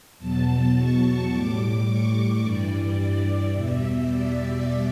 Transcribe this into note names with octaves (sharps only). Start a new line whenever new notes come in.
E2 B2 F#3 A5
C#6
A2 G3 D6
C#6
G2 E3 G3 D5
D5
E2 B2 G3 E5
D5